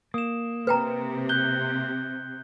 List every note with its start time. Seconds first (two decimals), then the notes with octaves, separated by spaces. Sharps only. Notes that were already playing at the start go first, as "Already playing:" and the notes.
0.14 A#3 D#6 E7
0.67 C3 B4 G5 A#5
1.29 F#6 G6 G7